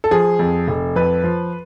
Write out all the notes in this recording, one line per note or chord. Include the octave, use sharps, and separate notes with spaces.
A4
F3 G#4
F2
F1
F2 B4
F3